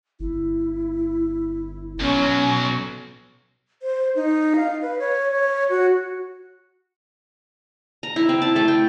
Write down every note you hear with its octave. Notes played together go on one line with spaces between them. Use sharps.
G1 E4
B1 F#3 B3 C#4
C5
D#4
F5
B4
C#5
C#5
F#4
A#5
E4
C4
A5
A3
G5